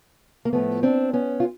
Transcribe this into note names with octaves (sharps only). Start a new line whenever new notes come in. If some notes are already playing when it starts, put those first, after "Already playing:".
A#3
A2 F3 A3 B3
C4 D4
B3 C#4
F4